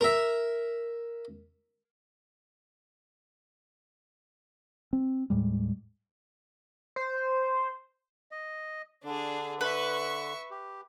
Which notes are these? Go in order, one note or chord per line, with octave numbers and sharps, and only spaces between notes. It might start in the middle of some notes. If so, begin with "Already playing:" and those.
A#4 E5
C4
D#2 A2 G3 G#3
C5
D#5
D3 D4 G#4
B4 E5 C#6
G4